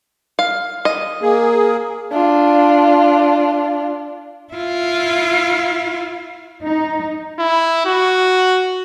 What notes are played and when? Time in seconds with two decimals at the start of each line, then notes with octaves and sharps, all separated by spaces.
0.39 F5
0.85 D#5
1.22 A#3 G#4
2.12 D4 F4
4.53 E4 F4
6.63 D#4
7.39 E4
7.86 F#4